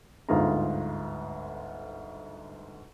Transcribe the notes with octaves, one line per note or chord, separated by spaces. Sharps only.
G1 D2 G#2 F4 G#4 A#5